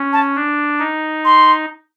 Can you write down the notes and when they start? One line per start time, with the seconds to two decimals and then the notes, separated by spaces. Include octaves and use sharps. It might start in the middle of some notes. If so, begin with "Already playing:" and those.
Already playing: C#4
0.13 A5
0.36 D4
0.79 D#4
1.25 C6